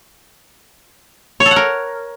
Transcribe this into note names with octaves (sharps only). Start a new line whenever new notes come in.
C#5
A4
F#5
A#4